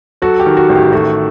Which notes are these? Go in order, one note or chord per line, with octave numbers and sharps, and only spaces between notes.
F#3 F#4 A4
G4
D#3
F#4
A1
G4
A3 F#4 A4